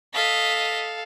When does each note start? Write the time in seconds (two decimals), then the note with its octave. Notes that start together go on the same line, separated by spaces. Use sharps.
0.14 A4 D#5 F5 B6